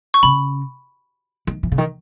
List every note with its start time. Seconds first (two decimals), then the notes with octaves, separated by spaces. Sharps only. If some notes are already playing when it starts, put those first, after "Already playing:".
0.14 C#6
0.23 C#3 B5
1.47 D#3
1.63 E3
1.72 C#3
1.78 D#3